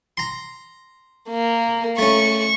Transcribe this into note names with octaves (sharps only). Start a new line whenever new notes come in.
A#5 C6
A#3
A3 C#4 C#6